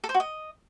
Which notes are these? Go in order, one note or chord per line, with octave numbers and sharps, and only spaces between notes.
A4
C5
F#4
D#5